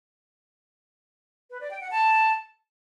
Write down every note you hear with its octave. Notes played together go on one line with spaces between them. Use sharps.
B4
D5
G5
F#5
A5